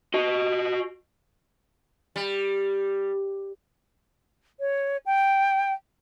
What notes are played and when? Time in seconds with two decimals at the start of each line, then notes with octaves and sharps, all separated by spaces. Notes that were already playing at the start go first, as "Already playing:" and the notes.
0.14 F#4 D#5
2.16 G3
4.60 C#5
5.06 G5